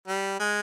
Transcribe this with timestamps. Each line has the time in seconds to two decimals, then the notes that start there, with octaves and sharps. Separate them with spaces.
0.08 G3
0.40 G#3